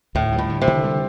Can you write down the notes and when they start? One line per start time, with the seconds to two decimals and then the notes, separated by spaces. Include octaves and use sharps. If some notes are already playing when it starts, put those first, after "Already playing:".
0.15 D2 A2
0.33 G3
0.38 A2
0.49 D3
0.62 C3
0.67 D3
0.84 G3